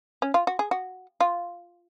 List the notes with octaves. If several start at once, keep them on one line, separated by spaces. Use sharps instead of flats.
C#4
F4
F#4
G#4
F#4
F4